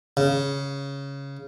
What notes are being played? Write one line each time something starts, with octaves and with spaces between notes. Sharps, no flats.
C#3